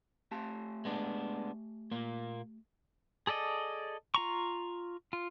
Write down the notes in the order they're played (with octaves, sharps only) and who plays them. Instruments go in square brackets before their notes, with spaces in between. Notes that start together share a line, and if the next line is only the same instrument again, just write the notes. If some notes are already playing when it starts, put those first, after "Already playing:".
[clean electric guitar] A3 G4 A5
[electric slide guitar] G#3 B3 D4
A#2 A#3
[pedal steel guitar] G#4 A4 D5 D#5
F4 A#5 C#6
F4